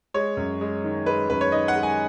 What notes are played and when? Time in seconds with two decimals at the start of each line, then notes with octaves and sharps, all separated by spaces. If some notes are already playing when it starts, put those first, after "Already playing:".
0.14 G#3 C#5
0.37 F#2
0.61 G#3
0.84 D#3
1.06 G#3 B4
1.30 F#2 B4
1.41 C#5
1.52 D#3 D#5
1.68 F#5
1.75 G#3
1.83 G#5